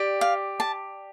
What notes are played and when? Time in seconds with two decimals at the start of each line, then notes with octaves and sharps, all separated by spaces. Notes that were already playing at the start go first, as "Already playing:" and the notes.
Already playing: G4 D5
0.21 F5
0.60 A5